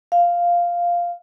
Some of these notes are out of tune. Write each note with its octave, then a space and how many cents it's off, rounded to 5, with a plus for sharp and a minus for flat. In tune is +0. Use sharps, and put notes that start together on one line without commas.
F5 -5